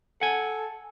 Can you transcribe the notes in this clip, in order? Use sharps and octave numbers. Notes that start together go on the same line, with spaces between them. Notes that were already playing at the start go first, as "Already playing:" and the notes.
A4 F#5 G#5